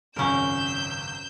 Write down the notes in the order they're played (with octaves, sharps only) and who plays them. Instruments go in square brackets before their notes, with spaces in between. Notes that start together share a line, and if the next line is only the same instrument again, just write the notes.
[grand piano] G#1 C#2 F#2 [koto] C#4 A#4 [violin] E6 G6